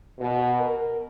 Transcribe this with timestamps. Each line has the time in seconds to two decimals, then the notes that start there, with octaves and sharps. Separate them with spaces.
0.19 B2
0.60 A#4